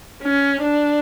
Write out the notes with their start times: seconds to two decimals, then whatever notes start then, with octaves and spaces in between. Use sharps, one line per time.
0.23 C#4
0.63 D4